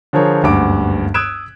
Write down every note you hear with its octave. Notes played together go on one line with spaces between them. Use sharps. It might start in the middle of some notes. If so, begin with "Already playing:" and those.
D3 F3 G#4 A#4 C5 C#5
F#1 D2 G2 F#5 D6 D7
D#6 E6 F#6 G#6 D7 E7